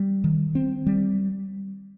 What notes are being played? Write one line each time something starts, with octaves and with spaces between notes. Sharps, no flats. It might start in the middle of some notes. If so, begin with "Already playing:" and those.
Already playing: G3
D#3
C4
G3